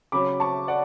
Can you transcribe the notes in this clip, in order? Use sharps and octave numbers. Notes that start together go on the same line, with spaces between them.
C#3 F#3 C#4 B5 D6
A5 C#6
D5 F#5